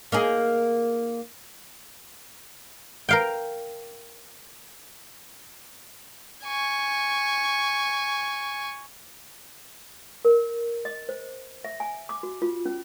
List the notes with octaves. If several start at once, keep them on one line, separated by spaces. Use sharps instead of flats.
A#3 D#4 G#4
A#4 F5 G5
G#5 C#6
A#4
D#5
C5
E5
G#5
D6
F#4
F4
C#4